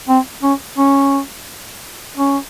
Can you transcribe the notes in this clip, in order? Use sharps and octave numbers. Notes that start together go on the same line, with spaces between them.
C4
C#4
C#4
C#4